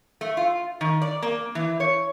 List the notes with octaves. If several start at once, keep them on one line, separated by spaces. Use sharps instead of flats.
A3
F4
D#3
D5
A#3
E3
C#5